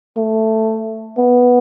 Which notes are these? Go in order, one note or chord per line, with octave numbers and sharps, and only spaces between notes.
A3
B3